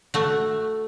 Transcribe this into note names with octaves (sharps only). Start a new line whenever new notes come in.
A3 F#4